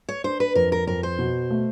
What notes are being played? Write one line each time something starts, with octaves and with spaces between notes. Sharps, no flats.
C#5
D4 C5
B4
F2 A#4
A#4
F2 A#4
C5
B2
A3